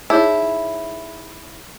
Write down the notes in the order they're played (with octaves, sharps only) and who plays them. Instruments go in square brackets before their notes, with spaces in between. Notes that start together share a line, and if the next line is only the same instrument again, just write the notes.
[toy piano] D#4 G#4 C#5 [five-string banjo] E4